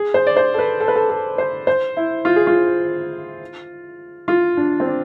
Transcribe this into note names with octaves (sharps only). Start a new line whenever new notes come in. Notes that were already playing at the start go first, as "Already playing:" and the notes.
Already playing: G#4
C5
D5
C5
A4
B4
A4
B4
A4
A4
C5
C5
E4
F4
G#4
F4
F4
D4
C4
D4